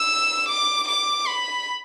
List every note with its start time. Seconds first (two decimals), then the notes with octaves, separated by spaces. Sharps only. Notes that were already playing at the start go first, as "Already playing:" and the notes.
Already playing: E6
0.49 D6
0.88 D6
1.27 B5